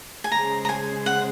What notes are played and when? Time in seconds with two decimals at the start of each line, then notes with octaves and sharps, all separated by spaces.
0.24 G#5
0.32 C#3 G#3 C#4 G#4 C5 A#5
0.65 A#5
0.69 G#5
1.06 F#5